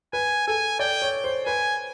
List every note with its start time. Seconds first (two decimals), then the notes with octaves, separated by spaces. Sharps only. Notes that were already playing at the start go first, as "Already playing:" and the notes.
0.13 B4 G#5
0.47 A4 G#5
0.79 D5 G5
1.02 C#5
1.24 C5
1.46 B4 G#5